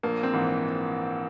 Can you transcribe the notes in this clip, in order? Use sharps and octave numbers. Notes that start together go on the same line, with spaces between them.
A#1 A#3
C4
G#2 E3